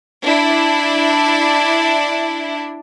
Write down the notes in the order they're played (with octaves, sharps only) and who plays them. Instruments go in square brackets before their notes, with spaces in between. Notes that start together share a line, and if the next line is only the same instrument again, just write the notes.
[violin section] D4 E4